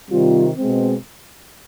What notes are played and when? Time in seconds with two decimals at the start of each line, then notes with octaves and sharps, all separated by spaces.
0.11 C3 D#3 G3 C4 F4
0.58 B2 G#3 C4